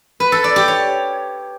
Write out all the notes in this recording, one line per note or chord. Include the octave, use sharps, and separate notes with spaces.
B4
A4
D5
G4
C#5